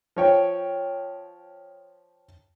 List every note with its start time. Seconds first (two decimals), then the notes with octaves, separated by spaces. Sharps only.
0.16 F3 C#5 G5